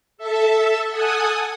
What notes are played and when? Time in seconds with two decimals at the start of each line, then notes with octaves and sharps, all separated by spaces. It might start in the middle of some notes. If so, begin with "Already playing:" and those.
0.17 A4 E5 A5
0.89 A4 F#5 G#5 D#6